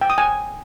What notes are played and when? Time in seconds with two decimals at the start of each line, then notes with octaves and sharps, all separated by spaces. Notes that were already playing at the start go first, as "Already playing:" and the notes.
0.01 G5
0.10 D#6
0.18 G#5